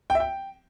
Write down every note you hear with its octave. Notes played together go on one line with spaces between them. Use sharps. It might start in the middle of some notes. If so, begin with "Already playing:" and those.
G5
E5
G5